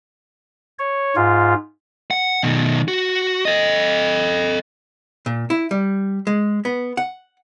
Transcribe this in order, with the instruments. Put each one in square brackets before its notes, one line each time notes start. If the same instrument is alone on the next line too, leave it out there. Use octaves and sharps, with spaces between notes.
[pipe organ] C#5
G#2 F4
[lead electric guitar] F#5
B2 D#3
F#4
A4 D#5
[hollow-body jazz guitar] A#2
E4
G3
G#3
B3
F#5